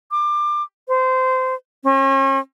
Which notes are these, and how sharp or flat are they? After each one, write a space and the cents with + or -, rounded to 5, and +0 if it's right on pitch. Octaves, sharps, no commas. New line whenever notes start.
D6 +25
C5 -20
C#4 -40